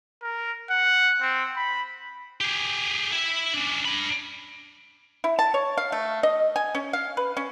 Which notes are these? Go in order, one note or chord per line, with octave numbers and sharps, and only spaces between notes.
A#4
F#5
C4
B5
G4 G#4
E4 E5
C#4 D4
D4 B5
E4
A5
C#5
F5
A3
D#5
G#5
C#4
F5
B4
C#4